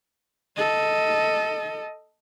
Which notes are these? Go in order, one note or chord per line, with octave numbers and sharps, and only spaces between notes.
A4 D#5